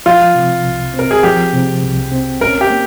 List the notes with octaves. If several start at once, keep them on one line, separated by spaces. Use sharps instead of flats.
F3 F4
C3
C2
C4
A#4
G#4
F3 G4
C3
C2
C4
C#4 A#4
G4
A#3